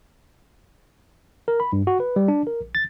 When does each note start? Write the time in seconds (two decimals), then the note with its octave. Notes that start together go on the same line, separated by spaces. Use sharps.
1.48 A#4
1.60 B5
1.73 G2
1.87 F#4
2.00 B4
2.16 G3
2.28 D4
2.47 A#4
2.61 A#1
2.75 A6